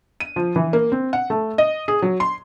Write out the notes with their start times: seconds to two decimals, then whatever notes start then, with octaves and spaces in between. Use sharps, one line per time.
0.20 D#7
0.36 F3
0.56 E3
0.73 A#3
0.92 C4
1.13 F#5
1.30 A3
1.58 D#5
1.88 G#4
2.02 F#3
2.20 C6